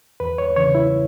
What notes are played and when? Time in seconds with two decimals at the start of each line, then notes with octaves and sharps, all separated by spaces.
0.20 E2 B4
0.38 C#5
0.56 C#3 E3 C#5
0.75 E4